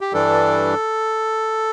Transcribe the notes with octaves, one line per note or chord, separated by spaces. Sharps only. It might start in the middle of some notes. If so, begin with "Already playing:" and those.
G4
G2 E3 G3 D4 A4